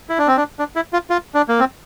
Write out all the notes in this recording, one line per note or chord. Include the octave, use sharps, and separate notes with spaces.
E4
D4
C4
D4
D4
E4
F4
F4
D4
A#3
C4